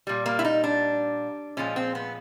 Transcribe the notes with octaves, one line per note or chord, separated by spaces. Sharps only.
A#2 G3
A#3
E4
D#4
D4
A#2 F3 G#3 C#4
C4
B3